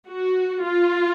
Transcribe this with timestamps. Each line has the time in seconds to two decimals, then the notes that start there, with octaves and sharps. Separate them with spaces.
0.09 F#4
0.64 F4